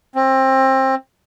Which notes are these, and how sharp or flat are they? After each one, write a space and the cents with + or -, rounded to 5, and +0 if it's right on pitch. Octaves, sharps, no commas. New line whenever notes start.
C4 +25